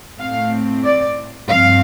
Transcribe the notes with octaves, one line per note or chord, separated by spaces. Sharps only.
A2 A3 C4 F5
D5
G2 F3 C4 F5